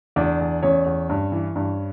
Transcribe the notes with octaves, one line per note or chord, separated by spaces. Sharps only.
E2 D4 D5
E2
E2 C#4 C#5
E2
G2
E3
G2